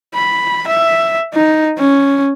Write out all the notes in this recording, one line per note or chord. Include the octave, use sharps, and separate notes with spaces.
B5
E5
D#4
C#4